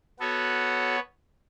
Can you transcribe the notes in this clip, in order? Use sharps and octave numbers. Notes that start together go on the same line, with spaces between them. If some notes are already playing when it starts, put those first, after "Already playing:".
B3 F#4 A4 C#5